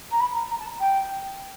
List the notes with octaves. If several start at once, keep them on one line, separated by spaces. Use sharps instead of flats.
A#5
B5
A#5
A#5
A5
G5